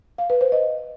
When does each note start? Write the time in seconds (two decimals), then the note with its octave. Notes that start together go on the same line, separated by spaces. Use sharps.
0.18 F5
0.30 B4
0.41 C5
0.52 D#5